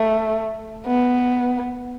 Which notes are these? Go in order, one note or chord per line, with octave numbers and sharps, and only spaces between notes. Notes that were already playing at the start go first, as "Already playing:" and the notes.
Already playing: A3
B3